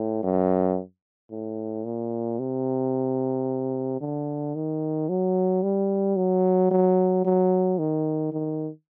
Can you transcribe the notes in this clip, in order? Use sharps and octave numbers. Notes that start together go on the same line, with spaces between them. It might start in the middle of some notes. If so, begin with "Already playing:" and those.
Already playing: A2
F#2
A2
A#2
C3
D3
D#3
F#3
G3
F#3
F#3
F#3
D#3
D#3